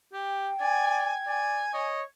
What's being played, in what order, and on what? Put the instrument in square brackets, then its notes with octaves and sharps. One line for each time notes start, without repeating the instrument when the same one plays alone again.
[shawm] G4 [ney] G5
[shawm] D5 [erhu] G#5 [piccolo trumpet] G#6
[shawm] D5 [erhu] G#5
[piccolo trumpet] C#5 [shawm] D#5